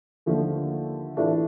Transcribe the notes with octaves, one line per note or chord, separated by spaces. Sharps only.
D#2 D3 F3 A3 D4
A2 E3 A3 D4 F4